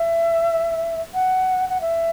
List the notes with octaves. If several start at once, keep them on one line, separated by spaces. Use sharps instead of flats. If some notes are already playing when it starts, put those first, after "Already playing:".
Already playing: E5
F#5
F#5
E5